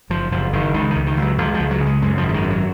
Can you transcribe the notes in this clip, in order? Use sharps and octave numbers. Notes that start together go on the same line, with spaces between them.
F#1 F3
F#1 F3
F#1 D#3
C#2 D#3
D#3
C#2
D#3
C#2 F#3
C#2 F3
F3
C#2
F#3
C#3
G#3
F#2 G#3
F3
G#1
F3
D#3
F#2
F#3